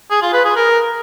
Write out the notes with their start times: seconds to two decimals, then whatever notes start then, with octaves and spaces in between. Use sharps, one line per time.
0.11 G#4
0.22 F4
0.33 B4
0.45 G#4
0.56 A#4